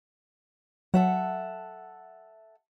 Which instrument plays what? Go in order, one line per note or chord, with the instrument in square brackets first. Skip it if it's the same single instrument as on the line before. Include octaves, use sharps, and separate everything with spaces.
[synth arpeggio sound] F#3 [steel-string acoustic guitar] A4 E5 F#5